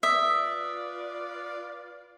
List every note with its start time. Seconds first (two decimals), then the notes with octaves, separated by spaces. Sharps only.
0.03 F4 B4 D5 E5 D#6